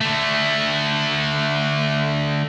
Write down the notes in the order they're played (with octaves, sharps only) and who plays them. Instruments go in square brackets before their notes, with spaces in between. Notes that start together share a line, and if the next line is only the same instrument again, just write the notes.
[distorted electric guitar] D3 A3